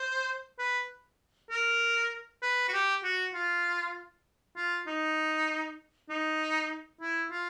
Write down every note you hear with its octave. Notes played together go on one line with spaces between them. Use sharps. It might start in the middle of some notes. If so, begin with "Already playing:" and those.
Already playing: C5
B4
A#4
B4
F#4
G4
F#4
F4
F4
D#4
D#4
E4
F4